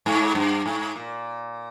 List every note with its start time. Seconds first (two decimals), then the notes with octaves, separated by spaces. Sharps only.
0.06 G#2
0.35 G2
0.66 G#2
0.96 A#2